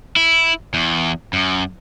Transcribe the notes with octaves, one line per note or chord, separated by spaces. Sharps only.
E4
E2
F#2